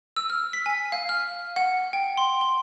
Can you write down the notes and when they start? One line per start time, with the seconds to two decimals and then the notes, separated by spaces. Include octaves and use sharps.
0.16 E6
0.30 F6
0.53 B6
0.66 G#5
0.92 F5
1.09 F6
1.56 F#5
1.93 G5
2.17 C6
2.41 G7